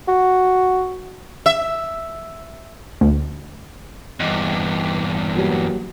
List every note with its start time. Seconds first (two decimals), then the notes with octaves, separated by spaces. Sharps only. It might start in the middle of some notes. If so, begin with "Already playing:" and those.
0.08 F#4
1.46 E5
3.01 D2
4.20 E2 G2 D#5
5.35 F#3 G3 A#3